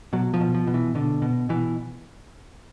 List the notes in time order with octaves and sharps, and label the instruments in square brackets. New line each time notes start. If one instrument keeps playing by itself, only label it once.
[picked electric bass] B2 F#3
F3
B2
F3
B2
E3
B2 D3
B2
B2 E3